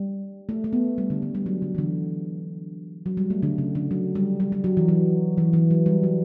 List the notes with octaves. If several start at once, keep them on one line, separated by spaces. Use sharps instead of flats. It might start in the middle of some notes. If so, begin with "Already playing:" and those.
Already playing: G3
A3
A3
B3
G3
D3
D3
G3
F#3
D3
E3
D3
F#3
G3
A3
D3
C#3
D3
F#3
G3
G3
G3
F#3
E3
F#3
E3
E3
F#3
G3
F#3